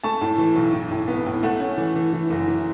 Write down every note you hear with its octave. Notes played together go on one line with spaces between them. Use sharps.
A3 A5 C#6
A2
E3
B1
A2
A2
B3
A2
A3 F#5
C#4
E3
E3
E3
F#1
E3